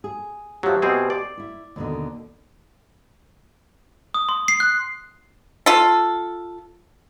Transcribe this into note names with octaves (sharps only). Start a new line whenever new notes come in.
G#4
F3 F#3 G4 E5
B2 C4 G#4
D5
E4 E5
D#2 B2 D3
D#6
C6
C7
F#6
F4 A4